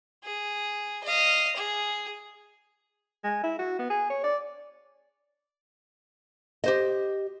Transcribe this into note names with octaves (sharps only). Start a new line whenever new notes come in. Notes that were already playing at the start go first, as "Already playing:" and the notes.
G#4
D#5 F5
G#4
G#3
E4
F#4
B3
G#4
C#5
D5
G4 C5 D#5